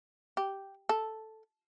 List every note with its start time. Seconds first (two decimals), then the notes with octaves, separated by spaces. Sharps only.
0.37 G4
0.89 A4